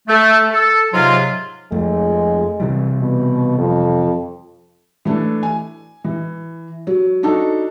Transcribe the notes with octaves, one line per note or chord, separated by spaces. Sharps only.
A3
A4
G#2 C3 F#3 F4
F2 G#3 A3
C3 E3 G3
B2
F2
E3 A3 D4
G#5
E3
F#3
D4 D#4 F#4 A4